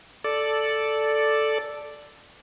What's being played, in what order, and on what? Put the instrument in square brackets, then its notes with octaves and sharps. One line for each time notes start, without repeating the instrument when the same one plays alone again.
[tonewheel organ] A4 D5